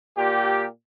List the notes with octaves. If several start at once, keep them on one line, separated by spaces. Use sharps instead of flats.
A#2 G4